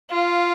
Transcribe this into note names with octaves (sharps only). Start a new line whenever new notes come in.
F4 F5